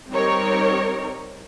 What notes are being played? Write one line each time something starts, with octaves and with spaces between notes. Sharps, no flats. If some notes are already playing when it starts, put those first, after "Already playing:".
G3 C4 D#4 G4 A#4 C#5